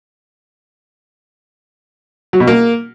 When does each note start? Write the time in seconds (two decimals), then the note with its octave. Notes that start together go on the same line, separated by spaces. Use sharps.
2.33 F#3
2.40 B2
2.47 A#3